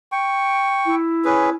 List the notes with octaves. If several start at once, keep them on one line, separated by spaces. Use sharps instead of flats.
G5 C#6
E4
C#4 G#4 B4